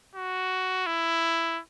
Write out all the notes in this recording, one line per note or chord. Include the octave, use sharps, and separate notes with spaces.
F#4
E4